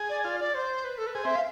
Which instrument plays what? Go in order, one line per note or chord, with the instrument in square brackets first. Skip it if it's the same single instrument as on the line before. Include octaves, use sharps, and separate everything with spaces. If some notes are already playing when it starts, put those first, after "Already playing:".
Already playing: [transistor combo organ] G#4
[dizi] D5
[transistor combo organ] F4 [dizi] D5
[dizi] D5
C5
B4
A4
B4
[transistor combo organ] G#4 [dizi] C5
[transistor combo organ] C4 [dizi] E5
[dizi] F5